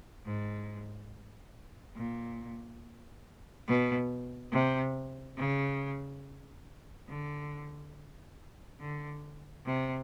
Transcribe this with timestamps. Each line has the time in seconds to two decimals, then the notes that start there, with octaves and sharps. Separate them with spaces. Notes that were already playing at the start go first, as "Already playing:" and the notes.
0.25 G#2
1.96 A#2
3.67 B2
4.52 C3
5.37 C#3
7.08 D3
8.80 D3
9.65 C3